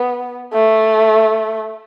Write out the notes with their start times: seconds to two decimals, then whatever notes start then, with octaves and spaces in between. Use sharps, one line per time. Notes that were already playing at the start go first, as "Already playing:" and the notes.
Already playing: B3
0.53 A3